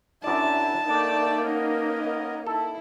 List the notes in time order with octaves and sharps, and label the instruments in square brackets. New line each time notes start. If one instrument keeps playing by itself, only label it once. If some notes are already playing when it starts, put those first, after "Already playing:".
[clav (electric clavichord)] F#2 D5 [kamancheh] D4 E4 [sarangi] A5
[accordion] A3 D5 G5 [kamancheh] A#3 D#4 [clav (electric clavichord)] D4
[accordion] B3 A#4 D#5 [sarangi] C#4
[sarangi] E4 [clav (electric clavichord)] A4